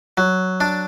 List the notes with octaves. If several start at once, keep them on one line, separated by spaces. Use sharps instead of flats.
F#3
D4